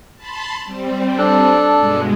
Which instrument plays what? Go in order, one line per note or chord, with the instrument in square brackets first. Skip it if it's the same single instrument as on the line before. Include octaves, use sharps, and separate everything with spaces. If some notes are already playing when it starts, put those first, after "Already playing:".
[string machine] A5 B5 C6
G3 C4
[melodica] D4 A4
[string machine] G2 B2 G#3